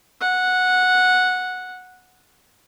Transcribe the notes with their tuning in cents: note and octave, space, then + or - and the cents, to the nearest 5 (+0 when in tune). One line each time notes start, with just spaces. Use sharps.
F#5 -10